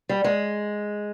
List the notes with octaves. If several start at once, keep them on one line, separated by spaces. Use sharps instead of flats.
G3
G#3